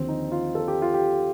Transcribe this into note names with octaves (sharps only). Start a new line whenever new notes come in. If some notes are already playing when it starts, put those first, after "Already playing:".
Already playing: D#2 D3 F3 C4
D#4
F4
A4
G4
F4
G4